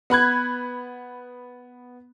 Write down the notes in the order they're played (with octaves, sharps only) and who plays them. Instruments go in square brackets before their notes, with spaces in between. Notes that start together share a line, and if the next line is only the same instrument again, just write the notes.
[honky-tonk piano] B3 B5 F#6 G#6